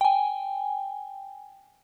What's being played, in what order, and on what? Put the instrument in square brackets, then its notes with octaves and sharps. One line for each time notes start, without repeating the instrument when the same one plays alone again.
[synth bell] G5 G#5